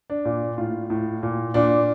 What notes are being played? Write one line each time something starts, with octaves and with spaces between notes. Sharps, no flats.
D4
A#2
A2 F4
A2
A#2
A#2 D4